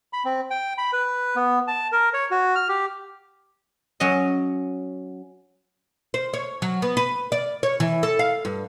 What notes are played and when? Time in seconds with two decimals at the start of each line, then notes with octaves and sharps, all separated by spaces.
0.13 B5
0.25 C4
0.51 G5
0.78 B5
0.93 B4
1.36 B3
1.68 A5
1.92 A#4
2.14 C#5
2.31 F#4
2.55 F6
2.69 G4
4.00 F#3 C#4 D#5
6.14 C5
6.34 C#5
6.62 F#3
6.82 B3
6.97 B4
7.32 D5
7.63 C#5
7.80 E3
8.03 A4
8.19 F5
8.45 G2